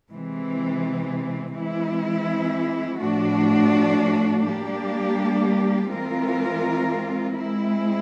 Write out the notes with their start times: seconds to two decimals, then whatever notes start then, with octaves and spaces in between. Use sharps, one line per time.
0.11 C3 E3 G#3 C4
1.55 E3 G#3 C4 E4
3.01 A2 F3 A3 D4 F#4
4.46 G3 A#3 D4 G4
5.91 E3 G#3 C4 F4 A#4
7.37 G#3 C4 E4